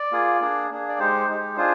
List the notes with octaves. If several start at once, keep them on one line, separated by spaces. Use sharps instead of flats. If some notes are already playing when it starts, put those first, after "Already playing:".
Already playing: D5
A#3 F4 G#4
A#3 D4 G#4
A#3 D4 G#4
D5
G#3 D#4 G4 C5
G#3 D#4 G4
D4 F4 G#4 C5